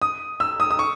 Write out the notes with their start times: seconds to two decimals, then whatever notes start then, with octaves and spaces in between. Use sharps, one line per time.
0.02 D#6
0.40 E6
0.60 D#6
0.71 D#6
0.79 C#6